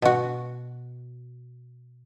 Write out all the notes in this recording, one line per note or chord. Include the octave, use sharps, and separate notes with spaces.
B2 F#4